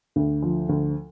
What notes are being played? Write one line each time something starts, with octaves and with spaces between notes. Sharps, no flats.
D2
F3
D2